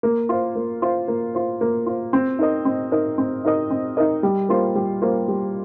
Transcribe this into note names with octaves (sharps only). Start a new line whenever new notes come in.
A#3
F4 C5
A#3
F4 C5
A#3
F4 C5
A#3
F4 C5
C4
D#4 A#4 D#5
C4
D#4 A#4 D#5
C4
D#4 A#4 D#5
C4
D#4 A#4 D#5
G3
A#3 F4 C5
G3
A#3 F4 C5
G3